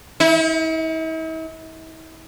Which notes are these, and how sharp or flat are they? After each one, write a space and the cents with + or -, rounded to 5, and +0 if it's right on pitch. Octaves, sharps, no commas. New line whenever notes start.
E4 -45